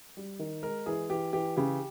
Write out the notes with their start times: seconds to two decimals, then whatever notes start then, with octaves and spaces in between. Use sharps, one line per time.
0.17 G3
0.39 D#3
0.63 G#3 A#4
0.86 E3 G#4
1.10 E3 G4
1.33 E3 G4
1.57 C#3 G4